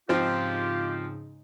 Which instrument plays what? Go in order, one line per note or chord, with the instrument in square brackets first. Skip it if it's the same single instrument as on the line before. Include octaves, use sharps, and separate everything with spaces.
[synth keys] G#2 C#3 D#4 [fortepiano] F3 C4 [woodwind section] F4 G4